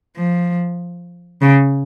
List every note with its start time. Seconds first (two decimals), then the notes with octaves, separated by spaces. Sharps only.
0.17 F3
1.42 C#3